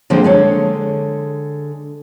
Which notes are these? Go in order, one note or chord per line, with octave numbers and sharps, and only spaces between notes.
D3 D#3 F3 G#3 A#3 C4
D3 G#3 A4 C#5